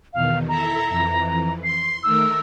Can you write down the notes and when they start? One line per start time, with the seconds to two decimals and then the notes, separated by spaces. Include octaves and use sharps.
0.13 E2 B2 D#3 F5
0.48 E4 A4 E5 A#5
0.89 F2 E3
1.64 C6 C7
2.03 D#3 A3 A#4 E6